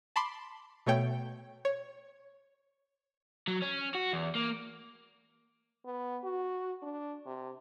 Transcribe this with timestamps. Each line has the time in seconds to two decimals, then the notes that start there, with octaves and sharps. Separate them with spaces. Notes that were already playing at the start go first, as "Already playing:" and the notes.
0.16 A5 B5 C6 D6 C7
0.86 B2 A3 C#5 G5
1.65 C#5
3.48 F#3
3.62 C#4
3.95 F#4
4.13 E2
4.35 A#3
5.85 B3
6.24 F#4
6.83 D4
7.26 C3